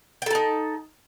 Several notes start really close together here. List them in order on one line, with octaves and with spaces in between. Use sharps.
G5 A4 A5 D#4